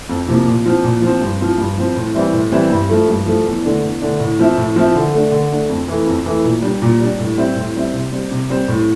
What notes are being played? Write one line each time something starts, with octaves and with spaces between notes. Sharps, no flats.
F2
C3 F3 A#3
A#2
F3 C4
A#2
F3 C4
G2
F3 C4
G2
F3 C4
A2
E3 G3 C4 E4
A2
E3 G3 C4 E4
G2
F3 A3
G2
F3 A3
E2
D3 A3 D4
E2
D3 A3 D4
A2
F3 C4 E4
A2
F3 C4 E4
D3
A3 D4
D3
A3 D4
F2
E3 A3
F2
E3 A3
A#2
G3 D4
A#2
G3 D4
A2
G3 C4 E4
A2
G3 C4 E4
C3
G3 C4
C3
G3 C4
A2